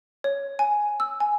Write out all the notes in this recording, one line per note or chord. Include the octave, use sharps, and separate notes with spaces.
C#5
G#5
E6
G#5